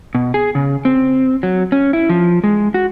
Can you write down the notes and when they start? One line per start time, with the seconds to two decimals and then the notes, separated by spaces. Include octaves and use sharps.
0.15 B2
0.34 G#4
0.55 C#3
0.85 C4
1.43 F#3
1.72 C#4
1.93 E4
2.09 F3
2.44 G#3
2.74 F#4